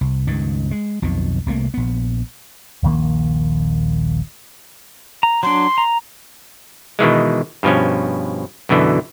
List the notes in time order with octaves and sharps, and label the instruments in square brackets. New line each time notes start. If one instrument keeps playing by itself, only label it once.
[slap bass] C2
C#2 G2 D#3
G#3
B1 F2 B2 D#3
C2 C3 A3 A#3
A#1 B3
[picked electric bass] D#1 A#1 D#3 A#3
[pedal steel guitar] A#5
[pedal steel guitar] F#3 D4 [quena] C6
[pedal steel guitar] A#5
[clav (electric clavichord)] B2 D#3 E3 G#3
G2 B2 F3 C#4
F#2 B2 D3 E3